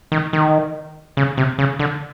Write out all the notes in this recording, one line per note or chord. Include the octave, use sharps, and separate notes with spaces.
D#3
D#3
C#3
C3
C#3
D3